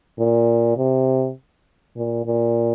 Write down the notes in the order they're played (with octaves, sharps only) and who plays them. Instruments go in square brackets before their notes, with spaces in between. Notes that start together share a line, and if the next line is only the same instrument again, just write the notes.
[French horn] A#2
C3
A#2
A#2